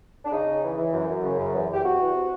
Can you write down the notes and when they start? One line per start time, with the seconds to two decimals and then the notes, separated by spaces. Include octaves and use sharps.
0.25 D4
0.31 C#3 D#4
0.46 C#3
0.62 E3
0.76 E3
0.92 F#2
1.08 F#2
1.23 C#3
1.38 F#2
1.54 E2
1.69 E2 G4
1.84 C3 F#4
2.00 E2
2.15 C3